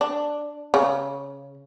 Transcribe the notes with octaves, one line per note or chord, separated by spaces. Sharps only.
D4
C#3